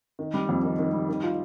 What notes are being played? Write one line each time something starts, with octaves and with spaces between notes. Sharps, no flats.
D#3
G3
F2
D#3
D#3
G3
D#3
F4